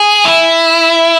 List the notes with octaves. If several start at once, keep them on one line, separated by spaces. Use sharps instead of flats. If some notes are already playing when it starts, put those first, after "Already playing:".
Already playing: G#4
E4